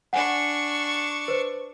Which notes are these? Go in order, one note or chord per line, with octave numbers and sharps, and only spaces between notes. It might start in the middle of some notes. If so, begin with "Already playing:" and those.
D4 F#5 G#5 C#6
B4 C5